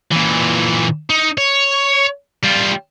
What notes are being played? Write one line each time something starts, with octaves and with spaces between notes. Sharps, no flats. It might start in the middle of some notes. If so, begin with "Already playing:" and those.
A#2 E3
D#4
C#5
G3 F4